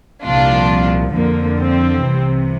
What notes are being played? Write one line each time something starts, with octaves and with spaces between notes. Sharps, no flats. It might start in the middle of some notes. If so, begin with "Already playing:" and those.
C2 A#2 F3 D4 F4
F2 D3 F3 A#3
C4
C2 C3 E3